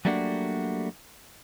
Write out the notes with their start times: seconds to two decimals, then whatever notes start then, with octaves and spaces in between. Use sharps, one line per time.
0.05 F#3 G3 A3 A#3 D4 F#4